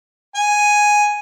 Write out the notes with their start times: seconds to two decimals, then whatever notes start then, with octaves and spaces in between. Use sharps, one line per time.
0.35 G#5